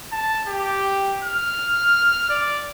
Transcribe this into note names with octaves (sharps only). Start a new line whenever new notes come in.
A5
G4
F6
D5